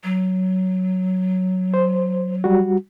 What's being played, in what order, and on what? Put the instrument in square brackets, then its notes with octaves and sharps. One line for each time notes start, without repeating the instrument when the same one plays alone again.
[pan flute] F#3
[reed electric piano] C5
G3 F#4